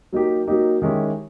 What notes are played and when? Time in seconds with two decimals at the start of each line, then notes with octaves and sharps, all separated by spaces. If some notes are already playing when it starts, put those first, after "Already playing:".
0.12 F#3 A#3 D#4 G4
0.48 F#3 A#3 D#4 G4
0.82 D#3 G#3 C#4 E4 G4